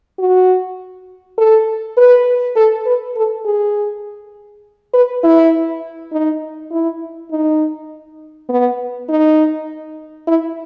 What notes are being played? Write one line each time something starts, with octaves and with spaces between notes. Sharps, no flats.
F#4
A4
B4
A4
B4
A4
G#4
B4
E4
D#4
E4
D#4
B3
D#4
E4